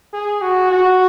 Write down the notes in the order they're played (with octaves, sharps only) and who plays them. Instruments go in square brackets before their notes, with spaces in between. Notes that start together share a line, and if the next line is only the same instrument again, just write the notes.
[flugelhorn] G#4
F#4
F#4